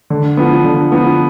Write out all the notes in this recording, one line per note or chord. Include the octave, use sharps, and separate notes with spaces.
D3
F3 B3
D3
F3 B3